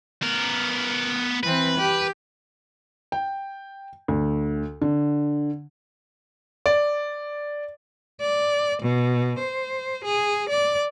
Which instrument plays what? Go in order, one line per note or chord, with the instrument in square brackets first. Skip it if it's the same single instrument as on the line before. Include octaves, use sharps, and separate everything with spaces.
[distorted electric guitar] B3 A#4
[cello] E3 C4 [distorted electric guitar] B4
[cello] G4
[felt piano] G5
D2
D3
[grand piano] D5
[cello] D5
B2
C5
G#4
D5